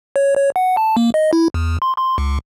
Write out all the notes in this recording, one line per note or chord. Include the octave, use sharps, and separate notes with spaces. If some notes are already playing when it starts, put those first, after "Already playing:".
C#5
C#5
F#5
A5
A#3
D#5
E4
E2
C6
C6
C#2